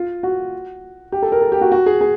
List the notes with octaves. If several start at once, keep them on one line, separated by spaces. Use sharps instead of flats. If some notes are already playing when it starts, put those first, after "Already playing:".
Already playing: F4
F#4
G4
A4
A#4
A4
G4
F#4
F#4
G#4
G#4